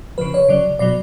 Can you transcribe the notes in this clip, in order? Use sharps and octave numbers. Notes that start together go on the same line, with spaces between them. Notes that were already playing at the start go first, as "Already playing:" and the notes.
C#3 F3 B4
C#5
C#3 F#3 D5
B2 F#3 D5